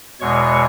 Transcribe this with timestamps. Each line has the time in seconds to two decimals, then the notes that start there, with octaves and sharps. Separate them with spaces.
0.21 E2 B2 G#3 C#5 C#6